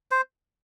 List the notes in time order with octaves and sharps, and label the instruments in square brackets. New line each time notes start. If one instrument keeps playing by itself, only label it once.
[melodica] C5